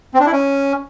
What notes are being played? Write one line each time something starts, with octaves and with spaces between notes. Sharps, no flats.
C4
D4
E4
C#4